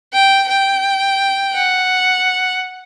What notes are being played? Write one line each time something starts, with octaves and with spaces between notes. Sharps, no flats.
G5
G5
F#5